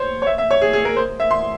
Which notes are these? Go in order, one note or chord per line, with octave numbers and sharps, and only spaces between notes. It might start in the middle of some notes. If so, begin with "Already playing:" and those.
Already playing: C5 C#5
C#5
E5
E5
C#5
G#4
G#4
A#4
C5
E5
C6